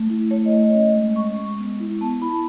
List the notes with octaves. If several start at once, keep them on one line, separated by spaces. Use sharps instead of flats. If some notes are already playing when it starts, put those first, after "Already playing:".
Already playing: A3
E4
A3 C#5
D#5
A3
D#5
C#4 D#5
G#3
G#3 C#6
G#3
B3
E4
B3 A5
E4 B5